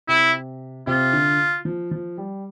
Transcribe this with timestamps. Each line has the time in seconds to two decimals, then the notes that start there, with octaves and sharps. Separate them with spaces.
0.08 C3 E4
0.87 C3 F4
1.13 D3
1.65 F3
1.91 F3
2.18 G3